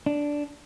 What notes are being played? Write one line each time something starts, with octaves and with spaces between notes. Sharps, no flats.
D4